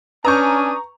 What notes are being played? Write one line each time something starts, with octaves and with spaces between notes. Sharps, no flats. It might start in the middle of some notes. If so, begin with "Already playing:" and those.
C#4 D4 B4 G#5 A#5 C#6 D#6 G6